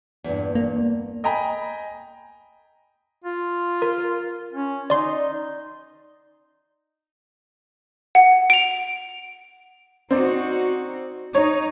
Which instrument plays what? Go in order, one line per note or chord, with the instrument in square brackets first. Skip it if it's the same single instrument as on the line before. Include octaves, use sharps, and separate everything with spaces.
[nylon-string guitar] E2 G2 A#2
[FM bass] A#3
[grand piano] D#5 G5 G#5 A#5 B5
[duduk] F4
[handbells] A#4
[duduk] C#4
[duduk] D#4 [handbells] D5 C6
[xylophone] F#5
D7 F7
[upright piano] C4 D5 [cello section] D#4 F#4
[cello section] D#4 [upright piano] C#5